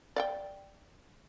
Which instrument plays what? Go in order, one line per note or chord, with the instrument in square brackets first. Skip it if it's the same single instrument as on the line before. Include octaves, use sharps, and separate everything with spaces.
[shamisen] D5 F#5 G5